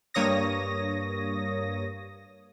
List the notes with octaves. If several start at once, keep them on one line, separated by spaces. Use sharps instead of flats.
G2 A#3 C#5 D#6 A#6